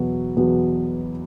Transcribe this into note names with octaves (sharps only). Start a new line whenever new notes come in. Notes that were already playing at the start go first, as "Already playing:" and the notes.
Already playing: E2 B2 F#3 B3
E2 B2 F#3 B3